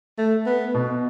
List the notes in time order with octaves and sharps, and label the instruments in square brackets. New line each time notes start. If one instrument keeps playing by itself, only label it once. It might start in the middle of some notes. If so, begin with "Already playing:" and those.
[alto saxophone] A3
B3
[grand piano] B2